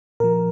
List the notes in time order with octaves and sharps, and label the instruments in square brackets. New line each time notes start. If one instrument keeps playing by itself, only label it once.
[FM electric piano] A#2 F3 A#4